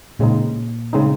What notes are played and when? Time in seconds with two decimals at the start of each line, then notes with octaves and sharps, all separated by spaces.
0.19 A#2 C#3 G#3 C4 D#4
0.93 C#3 G#3 C4 D#4